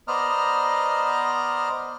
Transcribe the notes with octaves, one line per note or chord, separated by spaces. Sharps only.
B3 C5 D5 D#5 A#5 F6